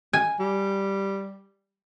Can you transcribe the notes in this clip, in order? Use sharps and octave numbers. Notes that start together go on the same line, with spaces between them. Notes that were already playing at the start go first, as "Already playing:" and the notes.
G#5
G3